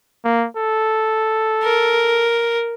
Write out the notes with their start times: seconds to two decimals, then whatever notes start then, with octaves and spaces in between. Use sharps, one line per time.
0.25 A#3
0.57 A4
1.64 A#4